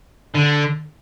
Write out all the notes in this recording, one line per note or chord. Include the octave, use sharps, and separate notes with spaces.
D3